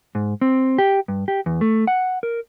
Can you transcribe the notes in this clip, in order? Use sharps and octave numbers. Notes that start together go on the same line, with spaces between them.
G#2
C4
G4
G2
G4
E2
A3
F#5
A#4